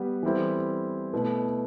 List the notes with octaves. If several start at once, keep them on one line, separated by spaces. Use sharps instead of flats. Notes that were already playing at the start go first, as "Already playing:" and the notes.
Already playing: G3 B3
E3 G3 C4 E4 A4
B2 A3 E4 B4